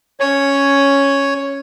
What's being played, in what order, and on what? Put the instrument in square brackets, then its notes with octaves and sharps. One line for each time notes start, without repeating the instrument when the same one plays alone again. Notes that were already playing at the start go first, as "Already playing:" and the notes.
[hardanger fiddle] C#4 [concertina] C#5